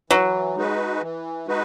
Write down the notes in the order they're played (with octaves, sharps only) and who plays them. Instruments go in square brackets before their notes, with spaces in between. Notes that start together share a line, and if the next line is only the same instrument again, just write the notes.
[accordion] E3 [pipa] F#3
[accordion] G#3 D#4 F#4 B4
E3
G#3 D#4 F#4 B4